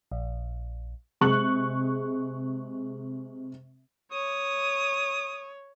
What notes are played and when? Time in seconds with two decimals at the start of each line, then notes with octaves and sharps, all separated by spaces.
0.12 A#1
1.21 C3 G#3 C#6 F#6 F#7
4.12 C#5 D#6